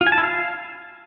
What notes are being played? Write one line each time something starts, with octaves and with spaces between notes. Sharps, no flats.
F4
G#5
A5
E4
F5